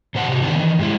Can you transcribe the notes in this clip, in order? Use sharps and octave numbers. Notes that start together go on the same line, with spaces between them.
B2 C5 F#5 A5
C3 F#4
D#3 C4 D4
D#3 E3
G2 G#3 E4